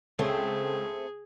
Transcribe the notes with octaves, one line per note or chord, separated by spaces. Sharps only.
C#2 A3 C4 G#4 A4 C#5